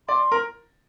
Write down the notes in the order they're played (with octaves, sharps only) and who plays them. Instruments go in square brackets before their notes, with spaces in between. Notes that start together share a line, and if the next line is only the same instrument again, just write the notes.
[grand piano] D5 [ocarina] C6
[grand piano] A#4